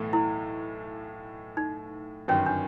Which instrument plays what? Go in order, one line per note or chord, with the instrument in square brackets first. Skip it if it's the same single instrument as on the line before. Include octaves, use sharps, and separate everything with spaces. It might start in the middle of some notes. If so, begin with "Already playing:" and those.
Already playing: [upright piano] B1 A2 E3 A3
[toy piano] E4
D#4
[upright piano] G1 F#2 D#3 [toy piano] C#4
[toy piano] D4